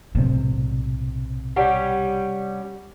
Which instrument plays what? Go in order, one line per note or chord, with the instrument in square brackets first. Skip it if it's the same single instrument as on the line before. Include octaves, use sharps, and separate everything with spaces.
[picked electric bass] B1 A2 C4 [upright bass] C3
[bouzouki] G3 C#4 [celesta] F#5